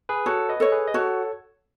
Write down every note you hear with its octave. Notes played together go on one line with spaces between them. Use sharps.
G#4 B4
F#4 A4 C#5
B4 D#5
A4 C#5
G#4 B4
D#5
F#4 A4 C#5